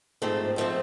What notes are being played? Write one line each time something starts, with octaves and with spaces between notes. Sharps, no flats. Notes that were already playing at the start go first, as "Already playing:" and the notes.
G#2 F3 A3 C4
G#2 F3 A3 C4